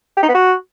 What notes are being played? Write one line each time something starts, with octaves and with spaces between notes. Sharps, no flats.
G4
D#4
B3
F#4